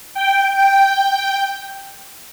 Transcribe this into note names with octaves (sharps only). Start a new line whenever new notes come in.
G5
G5